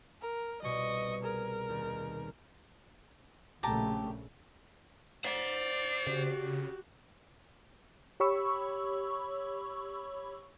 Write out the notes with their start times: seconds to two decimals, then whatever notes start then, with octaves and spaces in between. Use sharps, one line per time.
0.21 A#4
0.62 C2 B2 D#5 C#6
1.23 G#4 A#4
1.69 D#2
3.63 A#1 C#3 A3 G4 A5 A#5
5.25 C5 D5 F#5 C7
6.07 C#3 F#4 G4
8.20 G4 C#5 B5 C#6 E6